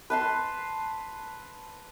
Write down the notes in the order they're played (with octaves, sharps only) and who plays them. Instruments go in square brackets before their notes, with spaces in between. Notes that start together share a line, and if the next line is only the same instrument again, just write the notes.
[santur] B4 A5 C6